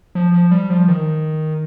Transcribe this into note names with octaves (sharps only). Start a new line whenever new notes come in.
F3
F3
G3
F3
D#3